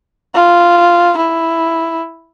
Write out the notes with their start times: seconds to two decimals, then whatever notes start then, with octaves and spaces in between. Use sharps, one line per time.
0.35 F4
1.17 E4